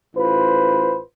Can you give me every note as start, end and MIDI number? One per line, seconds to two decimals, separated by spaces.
0.16 0.98 33
0.16 0.98 65
0.16 0.98 71
0.16 0.98 72